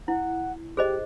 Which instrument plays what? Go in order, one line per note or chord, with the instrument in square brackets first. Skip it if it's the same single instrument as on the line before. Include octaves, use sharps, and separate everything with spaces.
[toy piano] E4 [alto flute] F#5
[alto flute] G4 [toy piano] G#4 C5 D#5